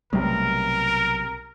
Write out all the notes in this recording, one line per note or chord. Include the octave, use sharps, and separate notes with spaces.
B1 C3 G3 A3 A#4